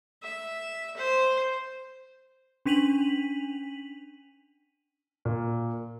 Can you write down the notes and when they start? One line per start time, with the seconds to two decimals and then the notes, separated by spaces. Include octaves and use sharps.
0.23 E5
0.97 C5
2.66 C#4 D4 B6 D#7 F7 F#7
5.25 A#2